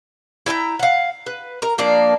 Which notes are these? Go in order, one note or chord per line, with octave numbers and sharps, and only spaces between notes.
E4 G5 G#5 A#5
F5 F#5
B4
A#4 A#5
F3 A#3 D4 D5